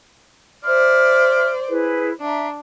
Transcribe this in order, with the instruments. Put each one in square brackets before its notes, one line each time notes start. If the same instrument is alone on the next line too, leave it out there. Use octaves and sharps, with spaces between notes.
[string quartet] C5 D5 [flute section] E5 F6
[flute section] E4 G#4 B4
[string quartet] D4 [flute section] E5 A#5